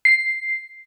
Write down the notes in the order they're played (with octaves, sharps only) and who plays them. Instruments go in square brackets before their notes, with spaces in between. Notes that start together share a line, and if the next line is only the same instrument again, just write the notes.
[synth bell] C7